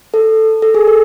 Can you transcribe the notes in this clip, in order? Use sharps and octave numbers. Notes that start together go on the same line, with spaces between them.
A4
A4
G#4
A4